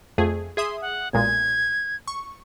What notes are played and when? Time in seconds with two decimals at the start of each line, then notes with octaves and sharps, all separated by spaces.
0.18 F2 A3 G#4
0.57 G#4 E5 C6 D#6
0.82 F#5
1.13 B1 A#2 G#3 G#6
2.07 C#6